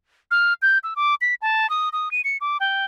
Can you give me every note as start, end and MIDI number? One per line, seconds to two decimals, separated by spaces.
0.31 0.54 89
0.62 0.78 91
0.84 0.94 88
0.96 1.15 86
1.21 1.35 95
1.42 1.69 81
1.70 1.89 87
1.93 2.11 87
2.11 2.21 99
2.24 2.37 97
2.41 2.58 86
2.60 2.85 79